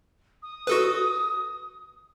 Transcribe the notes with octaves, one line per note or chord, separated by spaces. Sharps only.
D#6
F#4 A4 B4